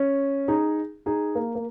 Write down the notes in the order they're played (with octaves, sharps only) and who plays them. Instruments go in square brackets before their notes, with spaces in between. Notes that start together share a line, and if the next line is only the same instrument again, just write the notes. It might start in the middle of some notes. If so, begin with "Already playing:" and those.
Already playing: [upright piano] C#4
D#4 G#4
D#4 G#4
A#3
A#3